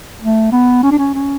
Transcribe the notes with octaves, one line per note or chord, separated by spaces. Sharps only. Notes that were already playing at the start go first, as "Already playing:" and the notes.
A3
B3
C#4
D4
C#4
C#4